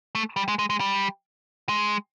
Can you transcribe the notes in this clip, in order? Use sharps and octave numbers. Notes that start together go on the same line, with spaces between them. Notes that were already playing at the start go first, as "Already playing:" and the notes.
A3
G3
G#3
G#3
G#3
G3
G#3